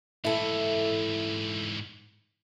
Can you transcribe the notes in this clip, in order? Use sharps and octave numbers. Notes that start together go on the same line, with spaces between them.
G#2 E3 E4 A4